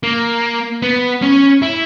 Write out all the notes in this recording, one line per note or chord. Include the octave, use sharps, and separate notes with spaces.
A#3
B3
C#4
E4